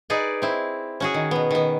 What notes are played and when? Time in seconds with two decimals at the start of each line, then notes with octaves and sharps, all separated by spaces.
0.10 D#4 G#4 B4 D5
0.42 C4 E4
1.00 C#4 F#4 G#4
1.14 D#3
1.31 B2 B3
1.51 D#3 B3